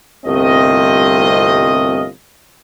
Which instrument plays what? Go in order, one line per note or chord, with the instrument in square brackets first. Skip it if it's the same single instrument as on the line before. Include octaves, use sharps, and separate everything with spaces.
[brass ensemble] G1 C2 A3 C4 F4 D#5